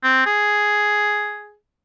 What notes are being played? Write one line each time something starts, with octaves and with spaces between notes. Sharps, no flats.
C4
G#4